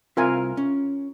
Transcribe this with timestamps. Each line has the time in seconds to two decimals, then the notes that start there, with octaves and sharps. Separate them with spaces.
0.17 C2 C4 F4 A#4 E5 G#5
0.57 C#4